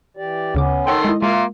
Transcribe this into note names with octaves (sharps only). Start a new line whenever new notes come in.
E3 G4 D5
D2 C#3 B3 C#4 D6
D#3 A4 C#5 F#5 G5 C6
G#3 E4 D#5
G#3 A#3 F4 E5